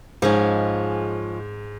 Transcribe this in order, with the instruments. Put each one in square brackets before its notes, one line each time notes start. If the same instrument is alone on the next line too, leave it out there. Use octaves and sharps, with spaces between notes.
[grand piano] G#2 [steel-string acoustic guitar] F3 G#3 C#4